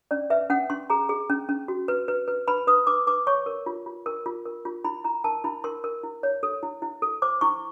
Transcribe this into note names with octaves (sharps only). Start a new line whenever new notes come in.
C#4 D5
B4 E5
C#4 F#5
C#4 C6
G#4 A#5
G#4
C#4
C#4
F#4
B4
B4
B4
B4 B5
B4 D#6
B4 D6
B4 D6
C#5 C#6
A#4
F4
F4
A#4
F4
A#4
F4
E4 B5
E4 A#5
A#4 A5
E4 B5
A#4 C6
A#4
E4
C#5
A4
E4
E4
A4
C5 D6
E4 C#6